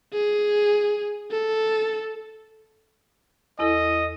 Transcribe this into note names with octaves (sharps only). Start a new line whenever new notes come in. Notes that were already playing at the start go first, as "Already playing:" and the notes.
G#4
A4
E2 E4 A4 D#5